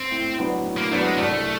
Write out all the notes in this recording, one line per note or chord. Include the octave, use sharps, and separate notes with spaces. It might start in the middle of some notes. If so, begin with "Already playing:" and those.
Already playing: C4
A2
F#3 B3 D4
A2
A#3
F#3 A3 B3 D4
G#3
C2 A3